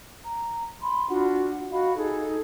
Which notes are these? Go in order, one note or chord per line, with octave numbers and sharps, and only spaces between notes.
A#5
B5 C6
D4 F4 F#4 F#5
F#4 D#5 F5 B5
D#4 G#4 A4